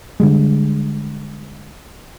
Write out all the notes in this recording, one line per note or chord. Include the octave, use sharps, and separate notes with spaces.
D3 G3 G#3